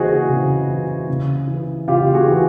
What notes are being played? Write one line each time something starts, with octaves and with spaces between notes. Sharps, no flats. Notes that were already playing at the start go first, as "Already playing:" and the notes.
Already playing: C#3 E3 F#4 G#4 C5 D#5
C#3
E3
C#3
E3
C#3 F4 G4
F#4 G#4
E3